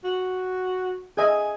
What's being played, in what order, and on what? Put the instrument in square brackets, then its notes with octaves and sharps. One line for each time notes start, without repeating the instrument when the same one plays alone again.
[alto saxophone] F#4
[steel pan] G#4 D#5 E5 [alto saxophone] G#5